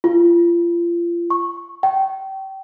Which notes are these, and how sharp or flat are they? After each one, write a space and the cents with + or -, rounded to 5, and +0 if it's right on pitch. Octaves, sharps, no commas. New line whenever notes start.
F4 -30
C#6 -10
G5 -30